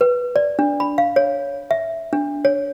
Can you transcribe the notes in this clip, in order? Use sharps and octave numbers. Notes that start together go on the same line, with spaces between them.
B4
D5
D4
B5
F5
C#5
E5
D4
C#5